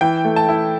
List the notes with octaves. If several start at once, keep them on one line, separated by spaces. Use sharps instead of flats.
E3 G5
A3
A5
E4